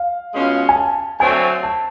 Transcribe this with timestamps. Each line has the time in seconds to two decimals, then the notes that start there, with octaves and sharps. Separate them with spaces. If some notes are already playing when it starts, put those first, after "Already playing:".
Already playing: F5
0.34 B2 G#3 C#4 F4
0.69 G#5
0.76 A5
1.20 D3 F#3 A3 C4 G#5
1.63 A5